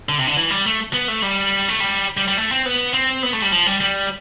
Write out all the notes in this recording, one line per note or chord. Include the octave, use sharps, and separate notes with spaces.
D3
C3
D3
E3
G3
A3
B3
A3
G3
A3
G3
G3
G3
A3
C4
B3
C4
B3
A3
G3
F3
G3
G3